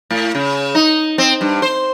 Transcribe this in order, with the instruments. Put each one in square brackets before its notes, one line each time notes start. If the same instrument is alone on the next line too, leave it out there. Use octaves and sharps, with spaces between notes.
[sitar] A2
C#3
D#4
C4
G2
C5